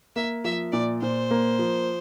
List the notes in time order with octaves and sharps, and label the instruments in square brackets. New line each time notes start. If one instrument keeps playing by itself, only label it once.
[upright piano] A#3 [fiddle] E5
[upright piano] F3 [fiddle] E5
[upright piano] A#2 [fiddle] D5
[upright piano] A#2 [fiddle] C5
[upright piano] A#3
F3